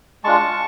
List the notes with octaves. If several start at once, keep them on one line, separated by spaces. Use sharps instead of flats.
G#3 D4 F4 A5 C#6